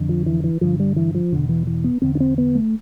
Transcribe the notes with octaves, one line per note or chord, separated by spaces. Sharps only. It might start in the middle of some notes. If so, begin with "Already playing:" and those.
Already playing: F2 D3
F3
E3
E3
G2 D3 F3
G3
E3
F3
E2 B2 D3
E3
E3
B3
E2 D3 C4
D4
C4
B3
A3